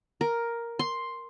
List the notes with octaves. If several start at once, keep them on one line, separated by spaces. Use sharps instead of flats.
A#4
C6